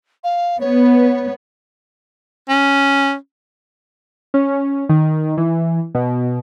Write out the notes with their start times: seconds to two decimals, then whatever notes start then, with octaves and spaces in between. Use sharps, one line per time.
0.24 F5
0.60 B3 C#5
2.49 C#4
4.34 C#4
4.89 D#3
5.37 E3
5.95 B2